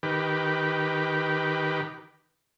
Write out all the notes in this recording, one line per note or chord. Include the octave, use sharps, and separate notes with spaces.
D#3 G4 B4